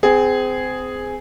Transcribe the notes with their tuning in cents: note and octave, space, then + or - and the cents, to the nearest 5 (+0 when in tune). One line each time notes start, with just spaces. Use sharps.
C4 -30 G#4 +0